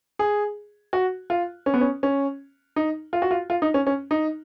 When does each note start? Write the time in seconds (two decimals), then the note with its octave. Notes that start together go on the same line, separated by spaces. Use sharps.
0.19 G#4
0.93 F#4
1.30 F4
1.66 C#4
1.74 B3
1.81 C#4
2.03 C#4
2.76 D#4
3.13 F4
3.22 F#4
3.31 F4
3.50 F4
3.62 D#4
3.74 C#4
3.87 C#4
4.11 D#4